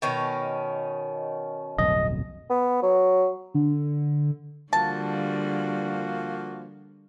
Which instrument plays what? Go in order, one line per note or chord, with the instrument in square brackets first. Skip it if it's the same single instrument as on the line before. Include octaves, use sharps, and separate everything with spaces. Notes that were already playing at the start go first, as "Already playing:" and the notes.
[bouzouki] B2 D#3 C#4
[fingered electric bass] D1 B1 F2 [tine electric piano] D#5
[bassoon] B3
F#3
[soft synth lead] D3
[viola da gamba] D3 G3 [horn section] F3 A#3 F#4 [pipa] A5